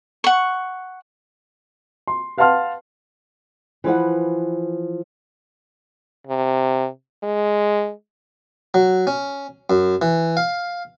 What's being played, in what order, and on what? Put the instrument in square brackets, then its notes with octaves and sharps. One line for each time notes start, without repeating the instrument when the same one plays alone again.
[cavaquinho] F#5 C#6
[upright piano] C6
B4 F5 F#5 A5 C6 F6
[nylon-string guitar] E3 F3 B4 F#5
[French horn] C3
G#3
[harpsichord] F#3
C#4
F#2
E3
F5